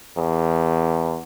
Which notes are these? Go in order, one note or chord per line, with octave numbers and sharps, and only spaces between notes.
E2